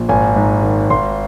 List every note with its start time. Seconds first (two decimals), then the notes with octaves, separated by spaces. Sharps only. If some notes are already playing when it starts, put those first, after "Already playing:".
Already playing: A#1
0.09 G#1 G#5
0.36 G#2
0.63 D#3
0.90 G#1 C6